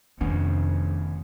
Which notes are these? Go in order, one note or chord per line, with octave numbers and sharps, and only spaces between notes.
F1 D#3 B3 C#4 D4